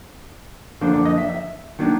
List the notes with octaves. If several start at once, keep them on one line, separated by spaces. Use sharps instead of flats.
F#2 D3 F3 A#3 D4 C5
D5
D#5
E5
E5
D#3 F#3 A#3 D4